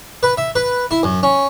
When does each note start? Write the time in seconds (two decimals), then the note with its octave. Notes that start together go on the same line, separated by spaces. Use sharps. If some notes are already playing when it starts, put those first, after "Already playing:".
0.23 B4
0.37 E5
0.55 B4
0.91 E4
1.03 F#2
1.23 C#4